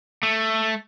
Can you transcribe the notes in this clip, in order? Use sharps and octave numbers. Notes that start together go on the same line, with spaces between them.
A3